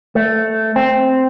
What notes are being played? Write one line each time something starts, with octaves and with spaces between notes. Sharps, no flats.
A3
C4